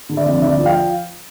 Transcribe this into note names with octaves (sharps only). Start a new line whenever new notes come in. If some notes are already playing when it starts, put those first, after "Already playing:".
D3
D5 E5
F2
D2 D5 E5
F3
F5 G5